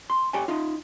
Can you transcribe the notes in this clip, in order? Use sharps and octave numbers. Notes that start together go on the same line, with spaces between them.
C6
G4 C#5 G5 G#5
D#4 F4